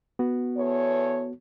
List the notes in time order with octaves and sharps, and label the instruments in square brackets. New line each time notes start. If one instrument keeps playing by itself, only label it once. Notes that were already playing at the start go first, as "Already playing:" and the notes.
[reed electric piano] B3 F#4
[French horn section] E2 A4 C#5